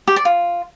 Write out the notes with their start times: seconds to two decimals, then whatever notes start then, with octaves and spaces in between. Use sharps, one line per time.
0.08 G4
0.16 D5
0.25 F4